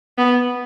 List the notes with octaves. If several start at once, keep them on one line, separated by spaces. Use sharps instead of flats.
B3